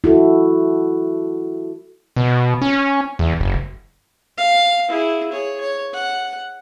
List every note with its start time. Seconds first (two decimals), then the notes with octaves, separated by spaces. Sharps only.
0.04 E4 F#4 A4
2.17 B2
2.62 C#4
3.19 E2
3.40 F#1
4.38 F5
4.89 E4 G#4
5.32 G#4 C#5
5.60 C#5
5.94 F#5